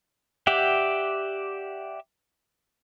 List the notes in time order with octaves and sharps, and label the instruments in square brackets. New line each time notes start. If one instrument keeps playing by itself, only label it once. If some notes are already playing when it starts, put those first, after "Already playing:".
[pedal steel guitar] G4 D5 E5 F#5 G5